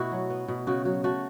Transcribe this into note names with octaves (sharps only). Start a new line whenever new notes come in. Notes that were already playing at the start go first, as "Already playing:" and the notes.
Already playing: B2 A3 B3 E4 F#4
F#3
B3
B2
C#3 F#4
F#3 F#4
A3 F#4